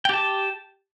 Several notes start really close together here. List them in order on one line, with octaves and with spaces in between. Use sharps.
G5 G4 A5